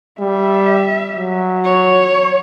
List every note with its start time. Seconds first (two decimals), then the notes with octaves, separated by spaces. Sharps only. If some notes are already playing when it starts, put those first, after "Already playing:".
0.20 G3 E5
1.16 F#3
1.65 C#5